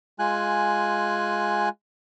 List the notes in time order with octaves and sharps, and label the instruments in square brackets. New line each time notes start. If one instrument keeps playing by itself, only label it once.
[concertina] G#3 F4 G#5 F#6